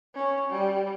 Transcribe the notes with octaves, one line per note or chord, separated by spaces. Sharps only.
C#4
G3